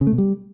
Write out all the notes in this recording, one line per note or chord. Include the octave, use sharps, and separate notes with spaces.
C#3
A3
B2
G3